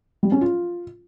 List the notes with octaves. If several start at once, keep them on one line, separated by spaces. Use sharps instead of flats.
G3
C#4
F4